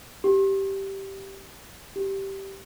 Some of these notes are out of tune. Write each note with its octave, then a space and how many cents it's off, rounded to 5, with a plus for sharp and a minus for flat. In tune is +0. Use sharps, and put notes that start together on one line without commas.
G4 -10
G4 -10